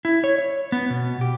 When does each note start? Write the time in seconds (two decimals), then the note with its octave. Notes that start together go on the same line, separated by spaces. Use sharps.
0.05 E4
0.24 C#5
0.38 C#5
0.72 B3
0.90 B2
1.21 G4